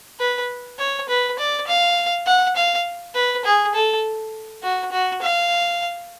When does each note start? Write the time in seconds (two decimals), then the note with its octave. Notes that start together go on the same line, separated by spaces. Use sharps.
0.20 B4
0.79 C#5
1.09 B4
1.39 D5
1.67 F5
2.27 F#5
2.56 F5
3.15 B4
3.45 G#4
3.75 A4
4.63 F#4
4.92 F#4
5.22 F5